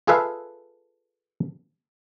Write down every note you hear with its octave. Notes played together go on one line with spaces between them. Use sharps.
F4 G#4 A4 B4 E5 F5